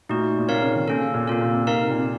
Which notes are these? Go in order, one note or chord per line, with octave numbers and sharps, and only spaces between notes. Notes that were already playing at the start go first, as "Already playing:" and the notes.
A#2 A3 D#4 F#4
A#2
C3 C4 D#4 A#4 C#5 F5
C#3
D#3
A#3 C#4 A4
C#3
A#2
C3 A#3 F4 A4
A#2
C3
C3 D#4 A#4 F5
A#2
C3